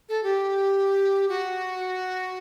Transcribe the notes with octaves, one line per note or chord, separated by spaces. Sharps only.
A4
G4
F#4